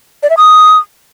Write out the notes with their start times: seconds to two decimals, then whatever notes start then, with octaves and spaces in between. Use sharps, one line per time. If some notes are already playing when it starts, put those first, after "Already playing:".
0.23 D5
0.30 E5
0.37 D#6